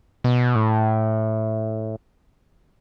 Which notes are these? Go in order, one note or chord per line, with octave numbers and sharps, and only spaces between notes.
B2
A2